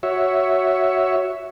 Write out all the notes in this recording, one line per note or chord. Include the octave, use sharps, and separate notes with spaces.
F#4 C#5 E5